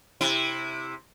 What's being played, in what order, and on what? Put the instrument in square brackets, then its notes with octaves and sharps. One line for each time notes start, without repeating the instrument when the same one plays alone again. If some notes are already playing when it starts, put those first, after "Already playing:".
[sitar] C3 E4